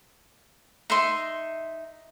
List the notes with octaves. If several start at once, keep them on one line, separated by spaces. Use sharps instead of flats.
D#4 E5 C6